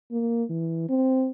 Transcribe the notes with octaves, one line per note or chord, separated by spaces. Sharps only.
A#3
E3
C4